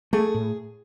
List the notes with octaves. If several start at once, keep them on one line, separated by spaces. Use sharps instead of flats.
A3 G#4
A2